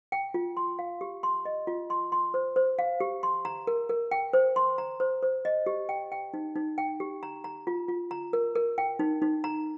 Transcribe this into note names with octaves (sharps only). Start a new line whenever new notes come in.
G5
F4
C6
F5
G4
C6
D#5
F4
C6
C6
C5
C5
F5
G4
C6
A#5
A#4
A#4
G5
C5
C6
A#5
C5
C5
D#5
G4
G5
G5
D#4
D#4
G5
G4
A#5
A#5
F4
F4
A#5
A#4
A#4
G5
D#4
D#4
A#5